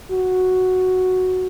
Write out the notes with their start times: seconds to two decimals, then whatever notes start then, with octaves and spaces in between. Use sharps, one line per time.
0.11 F#4